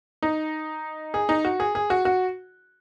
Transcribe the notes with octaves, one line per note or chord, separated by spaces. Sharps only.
D#4
G#4
D#4
F#4
G#4
G#4
F#4
F#4